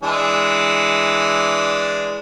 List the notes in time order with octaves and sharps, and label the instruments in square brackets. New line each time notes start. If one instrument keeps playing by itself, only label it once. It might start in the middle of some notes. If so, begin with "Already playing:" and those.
[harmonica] E3 G#3 D4